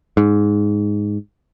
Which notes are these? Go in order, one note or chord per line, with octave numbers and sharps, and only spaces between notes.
G#2